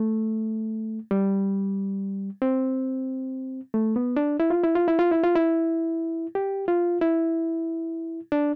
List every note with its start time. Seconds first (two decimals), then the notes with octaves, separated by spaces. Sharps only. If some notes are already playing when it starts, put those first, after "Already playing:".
Already playing: A3
1.11 G3
2.42 C4
3.74 A3
3.96 B3
4.16 D4
4.40 E4
4.50 F4
4.64 E4
4.75 F4
4.88 E4
4.99 F4
5.11 E4
5.23 F4
5.36 E4
6.35 G4
6.68 F4
7.01 E4
8.32 D4